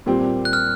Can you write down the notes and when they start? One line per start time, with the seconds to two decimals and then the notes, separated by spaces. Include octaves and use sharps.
0.06 A#2 G3 C4
0.45 F#6
0.53 F6